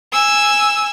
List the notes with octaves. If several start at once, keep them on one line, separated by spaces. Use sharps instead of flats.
G#5 E6